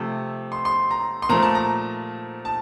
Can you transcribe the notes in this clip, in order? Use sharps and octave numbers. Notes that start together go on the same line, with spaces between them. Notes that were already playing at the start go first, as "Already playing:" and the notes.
Already playing: C3 F3 A3
C6
C6
A#5
C6
A#2 F3 A3 A#5
A5
A#5
A5